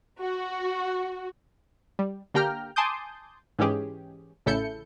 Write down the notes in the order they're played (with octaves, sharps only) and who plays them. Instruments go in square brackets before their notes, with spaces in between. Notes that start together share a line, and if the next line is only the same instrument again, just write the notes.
[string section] F#4
[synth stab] G3
D3 A#3 G4 G5 A#5 F6
G#5 A5 C6 D6 D#6 G6
G#2 E3 G#3 C#4 G4 G#4
A1 C#3 E4 A4 G6 C#7